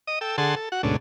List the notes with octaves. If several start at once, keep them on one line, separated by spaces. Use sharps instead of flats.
D#5 D#6
A4 G5 E6
D3 G#4 A4 F#5 A5 C6
A4
F#4 F#5
D2 G#2 B2 A3 C#4 D4